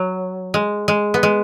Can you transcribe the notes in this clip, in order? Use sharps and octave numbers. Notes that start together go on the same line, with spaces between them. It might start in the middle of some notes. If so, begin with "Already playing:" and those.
Already playing: F#3
G#3
G#3
B3
G#3